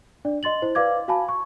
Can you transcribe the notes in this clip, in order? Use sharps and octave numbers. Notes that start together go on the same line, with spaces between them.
D4 D5
D#5 C6 A6 F#7
E4 C5
B4 D5 F5 D6 G#6
F#4 F5 G#5 A5 B5
C#6